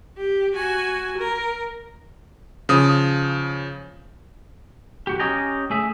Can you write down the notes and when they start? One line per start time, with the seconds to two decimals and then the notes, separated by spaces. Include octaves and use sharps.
0.17 G4
0.54 F#4 G#5
1.18 A#4
2.69 C#3 F3 D#6
5.07 B1 F#4 G4
5.20 C#4 G4 D#5 G5 G#5 A#5
5.70 A3 G#4 E5